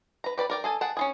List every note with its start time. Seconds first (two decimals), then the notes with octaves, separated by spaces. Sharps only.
0.24 B4 A#5
0.38 G4 B4 D5 B5
0.50 A#4 D5 G5
0.64 G#4 A4 G#5
0.81 G#4 F#5 G5 A5
0.97 C#4 F4 G#4